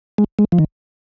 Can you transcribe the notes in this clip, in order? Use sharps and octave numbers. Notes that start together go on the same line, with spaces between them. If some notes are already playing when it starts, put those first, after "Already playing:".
G#3
G#3
F3
D#3